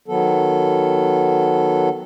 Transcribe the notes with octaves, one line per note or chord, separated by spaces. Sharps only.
D#3 F#3 B3 A4